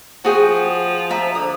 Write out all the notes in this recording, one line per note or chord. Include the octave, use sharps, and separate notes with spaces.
F3 F#4 G#4 G5
E5 A#5
D3 D#6